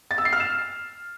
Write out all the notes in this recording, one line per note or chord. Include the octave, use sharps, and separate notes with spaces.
A6
E6
C7
F6
E7